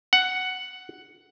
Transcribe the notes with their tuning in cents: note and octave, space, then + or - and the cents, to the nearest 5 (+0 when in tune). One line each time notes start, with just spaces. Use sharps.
F#5 +5